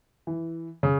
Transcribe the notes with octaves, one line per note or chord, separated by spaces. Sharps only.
E3
C#3